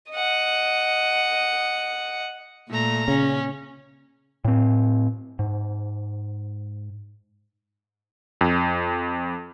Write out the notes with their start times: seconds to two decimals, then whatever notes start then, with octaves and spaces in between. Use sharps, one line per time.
0.11 D#5 F#5
2.70 A#2 A3 A#5
3.08 C#3 C#4
4.45 A2 C4
5.39 G#2
8.41 F2